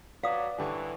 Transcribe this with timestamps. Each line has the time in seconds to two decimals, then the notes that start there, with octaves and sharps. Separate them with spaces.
0.24 F#3 B4 D5 F5 D#6
0.58 G2 D3 E3 C#6